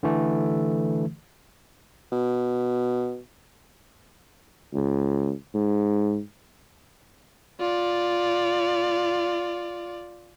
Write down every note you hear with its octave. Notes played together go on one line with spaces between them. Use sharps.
D3 E3 A3
B2
C#2
G#2
F4 D5